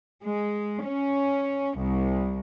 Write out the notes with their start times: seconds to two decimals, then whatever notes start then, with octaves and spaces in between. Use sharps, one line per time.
0.22 G#3
0.83 C#4
1.76 C2